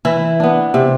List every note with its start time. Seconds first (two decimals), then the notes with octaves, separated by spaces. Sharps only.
0.05 E3 E4
0.40 B3 D4
0.74 C3